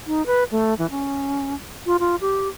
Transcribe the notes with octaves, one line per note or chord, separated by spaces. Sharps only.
D#4
B4
A3
E3
C#4
F4
F4
G4